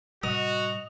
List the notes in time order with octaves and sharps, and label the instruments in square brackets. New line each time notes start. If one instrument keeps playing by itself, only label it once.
[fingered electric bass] A2 C3 G3 [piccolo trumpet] F#4 [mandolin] D#5 [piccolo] F7